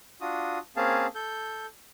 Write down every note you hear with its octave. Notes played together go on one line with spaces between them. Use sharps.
D4 F4 F#4 D#6
A#3 C4 C#4 G#4 F5 A5
A4 G6